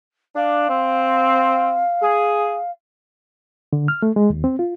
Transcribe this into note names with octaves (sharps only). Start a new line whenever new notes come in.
D4 F5
C4
G#4
D3
F6
A3
G#3
D#2
C4
F4